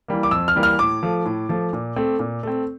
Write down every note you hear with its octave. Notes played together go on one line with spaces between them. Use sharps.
E3 G3 A#3
D6
F2 E6
F6
E3 G3 A#3
F6
A2 D6
F3 A3
A2
F3 A3
A#2
A3 C4
A#2
A3 C4